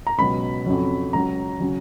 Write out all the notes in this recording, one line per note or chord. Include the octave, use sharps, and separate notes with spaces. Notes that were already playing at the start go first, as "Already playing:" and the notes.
A#5
C#2 B2 F#3 B5
F2 C#3 F#3
C#2 C#3 F#3 A#5
C#3 F#3